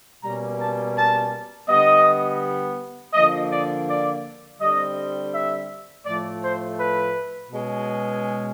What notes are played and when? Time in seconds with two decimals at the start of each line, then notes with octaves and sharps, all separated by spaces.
0.23 B2 G3 A#3 C#4 A#5
0.59 A5
0.96 A5
1.68 D3 G3 B3 D#5
3.14 D3 F3 A#3 D#5
3.50 D5
3.87 D5
4.59 D3 G3 C4 D#5
5.33 E5
6.05 A2 F3 A3 D5
6.42 C5
6.78 B4
7.51 B2 G#3 C#4